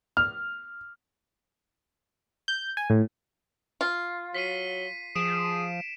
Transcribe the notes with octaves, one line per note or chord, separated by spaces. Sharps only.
F6
G6
G#5
A2
F4
F#3 B6 C7 D#7
F3 G#4 D7 E7